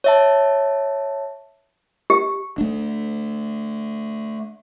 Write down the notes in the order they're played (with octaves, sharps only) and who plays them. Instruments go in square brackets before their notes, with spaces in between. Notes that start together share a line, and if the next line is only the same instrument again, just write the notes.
[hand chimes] C#5 E5 A5
[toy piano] G4
[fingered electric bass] A3 D4